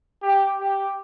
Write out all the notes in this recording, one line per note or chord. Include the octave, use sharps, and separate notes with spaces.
G4
G4